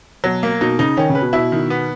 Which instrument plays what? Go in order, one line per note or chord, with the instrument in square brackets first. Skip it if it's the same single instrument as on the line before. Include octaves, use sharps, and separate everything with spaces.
[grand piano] B2 [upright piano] F#3
[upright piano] A#3
[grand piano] B2 [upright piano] D#4
[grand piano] C#3 [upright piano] D#4
[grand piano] D#3 [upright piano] C#4
[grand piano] C#3
[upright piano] B4
[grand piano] B2
[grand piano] B2 [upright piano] E4
[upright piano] D#3
B3